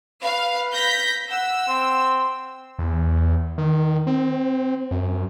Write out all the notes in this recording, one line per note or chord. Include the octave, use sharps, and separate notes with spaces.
B4 F5
G6 A#6 B6
F#5 E6
C4
E2
D#3
C4
F#2